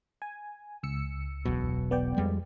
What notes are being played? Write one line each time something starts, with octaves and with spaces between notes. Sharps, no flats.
G#5
C#2 E6 C#7
E1 B1 B2
B3 D5 G5
F2 G3 G#3